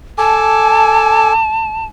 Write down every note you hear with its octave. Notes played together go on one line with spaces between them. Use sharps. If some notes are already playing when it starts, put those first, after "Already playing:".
A4 G#5 A5 D6